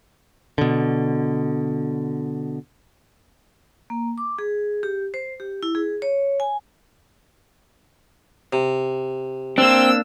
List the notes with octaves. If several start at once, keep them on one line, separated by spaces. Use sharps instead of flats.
B2 D3
A#3
D6
G#4
G4
C5
G4
E4
G#4
C#5
G#5
C3
A#3 C4 D4 E6